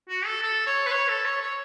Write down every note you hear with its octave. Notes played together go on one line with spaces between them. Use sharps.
F#4
A4
A4
C#5
B4
C#5
A4
C#5
C#5